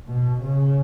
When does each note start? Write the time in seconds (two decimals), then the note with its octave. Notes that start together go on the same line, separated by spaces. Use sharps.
0.08 B2
0.41 C#3